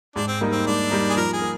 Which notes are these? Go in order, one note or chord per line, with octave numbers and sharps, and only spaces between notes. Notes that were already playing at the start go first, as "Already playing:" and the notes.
G#2 D4
C4
G3 A#3 D#4
C4
G#2 D4
G3 A#3 D#4
G#4
F3 A#4
G#4
A#3